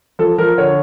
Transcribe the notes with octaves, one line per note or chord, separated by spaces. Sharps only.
F3 A4
F3 A#4
D3 C#5